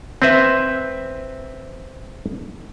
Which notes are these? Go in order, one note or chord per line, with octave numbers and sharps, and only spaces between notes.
C4 B4 E5